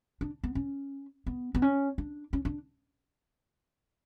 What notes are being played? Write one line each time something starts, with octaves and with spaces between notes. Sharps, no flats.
D4
B3
C#4
B3
B3
C#4
D4
C#4
D4